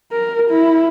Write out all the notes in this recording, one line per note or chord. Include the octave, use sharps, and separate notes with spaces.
A#4
E4